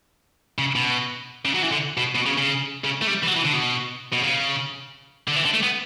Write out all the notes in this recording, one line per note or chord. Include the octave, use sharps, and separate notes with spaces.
C#3
B2
C#3
F#3
E3
D3
B2
B2
C#3
C#3
C#3
A3
G3
E3
F#3
E3
D3
B2
B2
C#3
D3
E3
D3
A3
B3